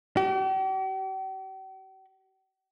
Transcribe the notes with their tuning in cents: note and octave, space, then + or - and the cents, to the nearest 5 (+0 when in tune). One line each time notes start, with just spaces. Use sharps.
G4 -45